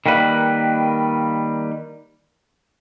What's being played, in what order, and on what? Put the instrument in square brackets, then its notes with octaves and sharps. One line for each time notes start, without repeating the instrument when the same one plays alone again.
[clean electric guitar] D#3 G3 A#3 B4